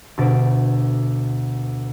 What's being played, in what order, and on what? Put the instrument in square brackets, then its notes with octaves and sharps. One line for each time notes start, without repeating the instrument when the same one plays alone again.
[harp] D2 B2 A6 D7